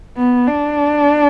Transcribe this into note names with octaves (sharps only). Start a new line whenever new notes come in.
B3
D4